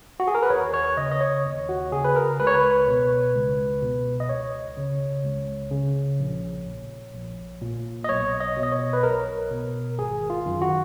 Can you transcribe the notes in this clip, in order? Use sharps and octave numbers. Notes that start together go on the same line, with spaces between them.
F#4
G#4
A#4
B4
D#2 C#5
C#5
C#3 D#5
D#5
C#5
D#2
F#4
C#3 G#4
B4
A#4
C#2 B4
C#5
B4
B2
C#2
B2
D#5
C#2 C#5
C#3
C#2
C#3
A#1
A#2
A#1
A#2
D#5
B1 C#5
D#5
B2
D#5
C#5
B4
B1 A#4
B2
G#1 G#4
F4
F#2 D#3
F#4